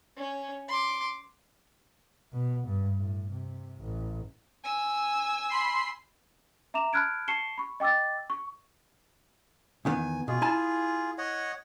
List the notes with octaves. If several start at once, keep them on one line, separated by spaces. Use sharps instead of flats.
C#4
C6 D6
B2
G2
A2
C3
A1
G#5 E6
B5 C6 C7
E5 A#5 D6 E7 F7
A5 B5 F6 F#6 G#6 D7
A5 C#6 C7 C#7 E7 G7
B5 C#6
D#5 G5 D6 E6 A6
C#6
E2 D#3 B3 G#5
B2 F4 G#4
E4 G#5 A5
C#5 D#5 F#5